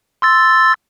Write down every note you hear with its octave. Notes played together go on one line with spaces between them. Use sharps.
C6 E6 A6